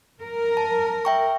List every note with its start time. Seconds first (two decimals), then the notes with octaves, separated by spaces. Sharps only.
0.22 A#4
0.57 A5
1.05 E5 G5 C#6